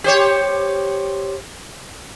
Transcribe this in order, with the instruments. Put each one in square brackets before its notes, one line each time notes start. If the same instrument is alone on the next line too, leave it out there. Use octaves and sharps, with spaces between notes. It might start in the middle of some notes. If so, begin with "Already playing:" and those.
[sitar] G4 C5 C#5